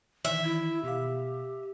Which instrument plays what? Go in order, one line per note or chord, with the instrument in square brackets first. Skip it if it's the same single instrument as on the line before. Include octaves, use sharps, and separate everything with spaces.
[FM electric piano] D#3 E3 [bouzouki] E5
[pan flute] E4
[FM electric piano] B2 F5 [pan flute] G4